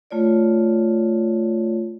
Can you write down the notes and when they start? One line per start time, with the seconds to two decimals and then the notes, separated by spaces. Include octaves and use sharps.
0.11 A3 F4 C#5 D5